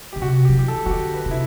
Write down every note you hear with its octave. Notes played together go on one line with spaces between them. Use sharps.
D3 G4
C3 F#4
G4
F#3
E3 G4
A4
E3 F#4
D3 G4
B4
C3
E4